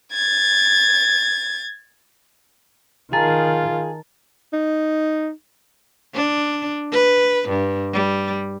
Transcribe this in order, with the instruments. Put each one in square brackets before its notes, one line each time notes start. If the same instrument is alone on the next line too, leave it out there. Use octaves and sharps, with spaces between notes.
[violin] G#6 A6
[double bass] D#3 [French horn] F4 [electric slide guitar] G#4 [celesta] A5 A#5 A6
[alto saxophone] D#4
[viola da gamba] D4
B4
G2
G3